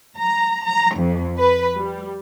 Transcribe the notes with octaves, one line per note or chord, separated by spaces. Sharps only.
A#5
A#5
F2
B4
G3